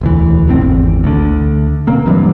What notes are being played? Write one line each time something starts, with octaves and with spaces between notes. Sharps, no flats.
E1 D2 E3
F1 A2 C4
G#1 E2
D2 D3
B2 A#3 C4
G2 E3 F#3